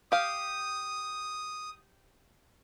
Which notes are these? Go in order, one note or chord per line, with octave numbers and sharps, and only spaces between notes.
G4 F5 D#6